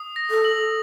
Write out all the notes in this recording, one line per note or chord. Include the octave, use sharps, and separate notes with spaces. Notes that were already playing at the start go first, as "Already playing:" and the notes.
Already playing: D#6
A#6
A4
F#7